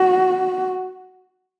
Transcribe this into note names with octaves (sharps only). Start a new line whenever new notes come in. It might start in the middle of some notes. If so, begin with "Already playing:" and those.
Already playing: F#4